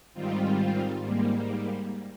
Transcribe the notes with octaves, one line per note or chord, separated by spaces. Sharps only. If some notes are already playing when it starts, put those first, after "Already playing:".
G#2 D#3 G3 C4 F4
G#2 G3 A#3